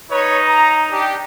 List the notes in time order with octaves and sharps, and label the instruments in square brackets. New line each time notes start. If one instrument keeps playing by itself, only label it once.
[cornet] D#4 [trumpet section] B4 C#5
[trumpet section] A#5
D4 G4